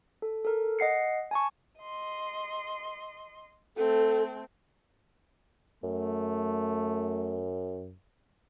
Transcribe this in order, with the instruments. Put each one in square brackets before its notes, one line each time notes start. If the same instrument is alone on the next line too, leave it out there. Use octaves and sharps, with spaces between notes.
[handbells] A4
A4 A#4
D#5 F#5 C7 C#7
G#5 A5 C#6
[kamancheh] D#5 C6
[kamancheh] A3 C4 [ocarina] A4
[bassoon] F#2 [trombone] A3